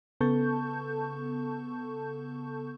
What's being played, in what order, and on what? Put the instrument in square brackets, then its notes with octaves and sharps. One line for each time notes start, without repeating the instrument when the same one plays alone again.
[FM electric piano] C#3 B3 A4 A5 C#6 G6